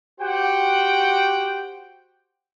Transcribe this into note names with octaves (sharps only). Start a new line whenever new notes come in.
F#4 G4 C5 F#5 G5